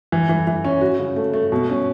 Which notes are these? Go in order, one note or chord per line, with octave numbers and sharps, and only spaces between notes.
E3
E3
E3
C#4
F#4
C#3
A3
A3
B2
C#4